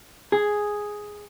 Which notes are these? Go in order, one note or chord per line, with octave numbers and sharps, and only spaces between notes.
G#4